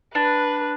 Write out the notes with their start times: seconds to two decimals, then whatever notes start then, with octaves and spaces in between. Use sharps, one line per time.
0.15 D4 B4